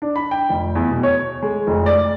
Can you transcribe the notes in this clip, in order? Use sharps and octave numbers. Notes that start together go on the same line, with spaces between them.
D4
B5
G5
F1
E2
B2
C#5
G#3
F1
D5